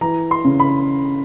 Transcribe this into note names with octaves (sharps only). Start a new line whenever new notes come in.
E3 A#5
C6
C#3
B5